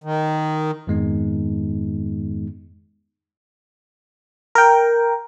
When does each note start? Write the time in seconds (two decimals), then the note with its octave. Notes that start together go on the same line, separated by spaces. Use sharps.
0.04 D#3
0.87 F2 G#2 D#3 G#3 B3 D#4
4.55 A#4 G5